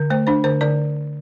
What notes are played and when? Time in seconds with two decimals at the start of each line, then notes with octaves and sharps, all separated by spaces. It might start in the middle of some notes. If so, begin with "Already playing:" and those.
Already playing: D3
0.10 A3 C5
0.27 D4 C5
0.44 D3 C5
0.61 D3 D5